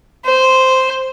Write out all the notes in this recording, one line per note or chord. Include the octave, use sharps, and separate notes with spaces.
C5